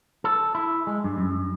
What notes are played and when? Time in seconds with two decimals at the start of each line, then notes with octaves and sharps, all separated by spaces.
0.24 A4
0.55 E4
0.87 G#3
1.04 G2
1.18 F#2